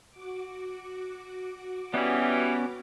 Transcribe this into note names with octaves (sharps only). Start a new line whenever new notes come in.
F#4 D6
E3 G3 B3 C#4